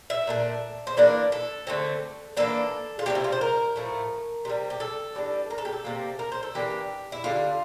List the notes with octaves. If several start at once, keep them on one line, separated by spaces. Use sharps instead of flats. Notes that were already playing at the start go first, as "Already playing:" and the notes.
E5
A#2 A3 D4
C5
E3 A#3 D4 D5
A4
D3 A3 C4
E3 A#3 D4 A4
F4
C3 E3 G3 G4
E4
F4
C5
A#4
A2 F3 A3
C3 E3 G3
G4
A4
E3 G3 D4
A#4
A4
G4
A4
C3 G3 A#3
A#4
C5
A4
E3 A#3 D4 G4
E4
D3 G3 D4 F4